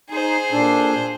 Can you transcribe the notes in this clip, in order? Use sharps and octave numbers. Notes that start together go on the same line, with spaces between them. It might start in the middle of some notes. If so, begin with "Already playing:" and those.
D#4 G#4 C5
A#2 D4 A4